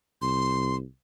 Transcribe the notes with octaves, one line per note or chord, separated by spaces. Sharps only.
C2 C6